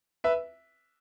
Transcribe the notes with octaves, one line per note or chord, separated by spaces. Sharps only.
B4 E5